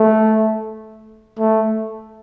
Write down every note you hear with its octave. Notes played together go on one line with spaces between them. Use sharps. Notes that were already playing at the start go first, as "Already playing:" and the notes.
Already playing: A3
A3